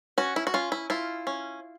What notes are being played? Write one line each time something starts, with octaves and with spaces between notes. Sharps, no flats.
C#4 F#4
E4
F#4
C#4 F4
E4
E4 F4
C#4